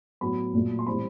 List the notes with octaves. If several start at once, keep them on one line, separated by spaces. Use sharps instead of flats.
A2 F#3 B3 B5
A#2 F#3 A3
C6
A2 E3 G3 C4 B5